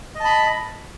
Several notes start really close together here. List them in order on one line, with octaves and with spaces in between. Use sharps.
D#5 A5 B5